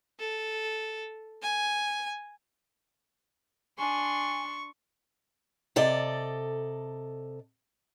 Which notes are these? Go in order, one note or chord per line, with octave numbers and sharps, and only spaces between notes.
A4
G#5
D4 G#5 C6 C#6
C3 A4 D5 D#5